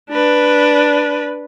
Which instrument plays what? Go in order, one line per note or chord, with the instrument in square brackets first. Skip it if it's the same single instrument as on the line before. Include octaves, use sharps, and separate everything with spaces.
[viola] D4 B4